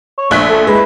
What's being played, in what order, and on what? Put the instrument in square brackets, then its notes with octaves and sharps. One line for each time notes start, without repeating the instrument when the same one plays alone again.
[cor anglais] C#5
[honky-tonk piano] A#1 F#6 B6 [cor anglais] A3
[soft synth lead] A4
[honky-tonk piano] G#3 [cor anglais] E4 [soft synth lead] B4